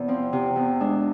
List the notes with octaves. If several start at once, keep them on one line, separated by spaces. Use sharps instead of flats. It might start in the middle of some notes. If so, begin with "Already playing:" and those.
Already playing: E2 C3
F3 C4
C3
E2
G#3 D4